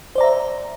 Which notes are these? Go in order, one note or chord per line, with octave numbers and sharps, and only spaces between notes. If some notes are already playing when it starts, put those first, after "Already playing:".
C5 D5 E5 A#5